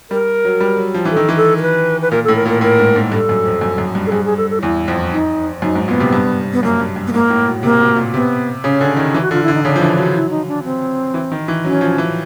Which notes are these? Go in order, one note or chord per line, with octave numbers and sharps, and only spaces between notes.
G3 A#4
F#3
G3
F#3
F3
E3
A4
D#3
E3
A4
A#4
B4
B4
A#2 A#4
A4
A2
A#4
A#2
A#4
A2 A#4
G#2
G#2
G2 A4
F#2
F2
F#2
F#2
G2
A4
G2 G#4
G#4
A4
A4
E2 E4
F2
D#4
F#2 D#4
G#2
A#2 B3
C3
G2
B3
F#2 A#3
G2
G2
B3
G#2 A#3
A2
B2
C3 A#3
B2
A#2
C3 B3
C#3 C#4
D3
D#3
E3
F#4
D3 F4
D3 E4
D#4
C#3 D4
F3
E3
F#3
E4
D#4
D4
C4
E3
D#3
E3
F#3 C#4
F3
E3